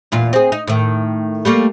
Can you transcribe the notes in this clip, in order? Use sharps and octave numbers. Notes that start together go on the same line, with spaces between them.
E2 A#2 F4
C4 G#4
D#4
A2 D#3
G3 A3 A#3